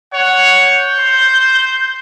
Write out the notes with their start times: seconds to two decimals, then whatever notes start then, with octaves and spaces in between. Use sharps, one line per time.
0.14 C#5 F#5
0.65 G6
0.99 C5